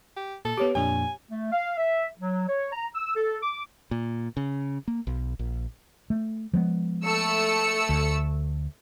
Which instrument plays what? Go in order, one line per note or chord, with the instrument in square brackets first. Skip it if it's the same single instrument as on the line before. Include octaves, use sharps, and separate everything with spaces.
[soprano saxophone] G4
[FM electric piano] A#2 [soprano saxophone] A4
[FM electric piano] B3 D6 [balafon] G4 C#5
[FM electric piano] F2 A#2 D4 [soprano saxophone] G#5
[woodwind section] A3
F5
E5
F#3
C#5
A#5
E6
A4
D6
[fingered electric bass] A#2
C#3
A#3
B1
A#1
[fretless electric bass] A3
F3 G#3 B3
[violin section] A3 E6 C#7
[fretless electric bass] D2